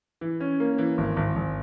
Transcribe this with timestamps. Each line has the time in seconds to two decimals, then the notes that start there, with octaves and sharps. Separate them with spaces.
0.21 E3
0.40 C#4
0.60 A#3
0.78 E3
0.98 G#1
1.17 G#1
1.36 G#1